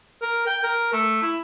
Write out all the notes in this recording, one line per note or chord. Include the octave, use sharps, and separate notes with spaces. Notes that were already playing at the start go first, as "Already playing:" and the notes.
A#4
G5
A#4
A3
E4